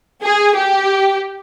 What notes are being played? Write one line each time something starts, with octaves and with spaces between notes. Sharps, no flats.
G#4
G4